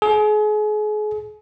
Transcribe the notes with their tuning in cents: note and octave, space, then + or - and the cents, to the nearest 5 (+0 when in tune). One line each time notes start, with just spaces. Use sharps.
G#4 +35